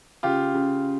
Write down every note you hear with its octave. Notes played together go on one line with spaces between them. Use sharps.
C#3 F4 G4
C#3